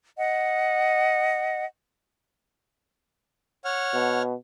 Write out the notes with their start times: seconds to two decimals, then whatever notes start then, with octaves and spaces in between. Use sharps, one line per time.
0.16 D#5 F#5
3.65 C#5 F#5 F6
3.94 B2